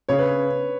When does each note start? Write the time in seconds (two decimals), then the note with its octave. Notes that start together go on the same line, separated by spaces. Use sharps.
0.09 C#3 C#5
0.18 B4